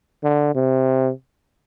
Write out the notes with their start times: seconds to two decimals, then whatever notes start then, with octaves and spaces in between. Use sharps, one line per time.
0.23 D3
0.55 C3